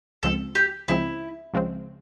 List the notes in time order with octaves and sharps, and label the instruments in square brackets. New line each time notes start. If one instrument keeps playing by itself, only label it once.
[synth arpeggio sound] C#2 C#3 F3 G#3 C4 [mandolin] A4
[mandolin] G4
[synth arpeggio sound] C#2 C#3 F3 G#3 C4 [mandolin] E4
[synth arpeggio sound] C#2 C#3 F3 G#3 C4